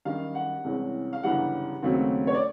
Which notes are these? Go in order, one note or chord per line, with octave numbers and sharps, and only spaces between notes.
F#2 D#3 G3 F5
F#5
C2 C3 E3 G#3 C#4
F5
G1 F#2 C#3 E3 G3 F#5
D#2 C#3 F#3 A3 C4
C#5
D5